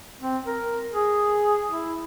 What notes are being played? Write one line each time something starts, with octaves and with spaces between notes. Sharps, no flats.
C4
A#4
G#4
E4